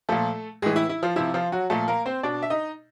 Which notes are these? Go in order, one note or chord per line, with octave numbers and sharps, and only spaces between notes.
A#2 F3 A3 A4
A2 E3 G#3 G#4
E4
E4
F3 F4
C3 F3 E4
F3 F4
F#3 F#4
A#2 F3 A3 A4
A#3 A#4
C4 C5
B2 D4 D5
E5
D#4 D#5